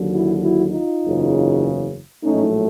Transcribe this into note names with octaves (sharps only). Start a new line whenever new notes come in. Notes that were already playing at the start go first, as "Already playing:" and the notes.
Already playing: D#2 D3 F#3
E4 F#4
E4 F#4
D#4 F4
F#1 E2 C#3
A#1 A2 F#3 A3 C#4 D#4